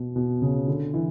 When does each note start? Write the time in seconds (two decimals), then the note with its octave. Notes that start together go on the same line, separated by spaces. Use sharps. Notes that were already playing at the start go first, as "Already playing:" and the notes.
Already playing: B2
0.16 B2
0.42 C#3
0.68 D3
0.94 E3